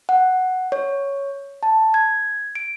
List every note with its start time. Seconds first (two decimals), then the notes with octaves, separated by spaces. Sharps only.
0.09 F#5
0.72 C#5
1.63 A5
1.94 G#6
2.55 D7